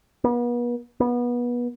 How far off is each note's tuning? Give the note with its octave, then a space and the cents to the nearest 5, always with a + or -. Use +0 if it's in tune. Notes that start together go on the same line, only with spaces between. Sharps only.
B3 -40
B3 -25